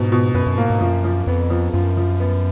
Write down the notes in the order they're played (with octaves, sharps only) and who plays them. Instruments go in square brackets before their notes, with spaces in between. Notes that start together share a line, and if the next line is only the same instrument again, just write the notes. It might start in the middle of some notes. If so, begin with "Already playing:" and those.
Already playing: [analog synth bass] G#2 [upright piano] B2
[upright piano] B2
[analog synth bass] F#2 [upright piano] B4
[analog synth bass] F#2
[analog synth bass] G#2 [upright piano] A#3
[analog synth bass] G#2
[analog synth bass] F#2 [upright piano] F3
[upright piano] F3
[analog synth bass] F2 [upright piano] B3
[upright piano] F3
[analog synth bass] F#2 [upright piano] F4
[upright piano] F3
B3